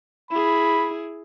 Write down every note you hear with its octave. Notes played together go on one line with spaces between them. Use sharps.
E4 G#4 B5